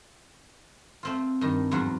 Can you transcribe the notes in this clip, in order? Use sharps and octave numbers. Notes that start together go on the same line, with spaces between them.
A3 C4 F4
G2 D#3
E2 G#2 F#3 F4 F#5